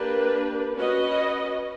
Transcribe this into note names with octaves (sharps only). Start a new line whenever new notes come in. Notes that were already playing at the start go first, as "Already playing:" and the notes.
Already playing: A#3 D4 G4 B4
C#4 F#4 B4 D#5